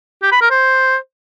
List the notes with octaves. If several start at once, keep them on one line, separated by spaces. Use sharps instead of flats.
G4
B5
A#4
C5